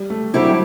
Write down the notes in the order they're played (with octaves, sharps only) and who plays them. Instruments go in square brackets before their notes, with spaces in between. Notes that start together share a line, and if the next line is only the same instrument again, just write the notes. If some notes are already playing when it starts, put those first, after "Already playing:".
Already playing: [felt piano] G3
A3
[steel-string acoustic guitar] D3 G3 C4 E4 G4 [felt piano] F#3